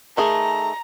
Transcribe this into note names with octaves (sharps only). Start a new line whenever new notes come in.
D#3 A3 G#4 A#5